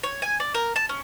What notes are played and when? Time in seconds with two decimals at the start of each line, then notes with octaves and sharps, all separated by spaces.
0.03 C#5
0.22 G#5
0.40 D5
0.55 A#4
0.76 A5
0.89 C#4